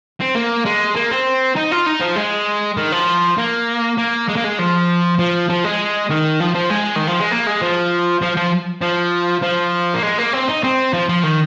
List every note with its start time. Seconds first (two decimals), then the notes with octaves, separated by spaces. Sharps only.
0.20 C4
0.35 A#3
0.65 G#3
0.96 A#3
1.11 C4
1.56 D#4
1.71 F4
1.86 D#4
2.01 F3
2.16 G#3
2.77 D#3
2.92 F3
3.38 A#3
3.98 A#3
4.28 G#3
4.36 A#3
4.44 G#3
4.59 F3
5.19 F3
5.49 F3
5.64 G#3
6.10 D#3
6.40 F3
6.54 F3
6.70 G#3
6.95 D#3
7.07 F3
7.19 G#3
7.31 A#3
7.46 G#3
7.61 F3
8.22 F3
8.36 F3
8.82 F3
9.42 F3
9.94 A#3
10.03 G#3
10.18 A#3
10.33 C4
10.48 D#4
10.64 C4
10.93 F3
11.09 F3
11.23 D#3